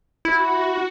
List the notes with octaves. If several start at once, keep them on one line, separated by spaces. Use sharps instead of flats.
E4 F#4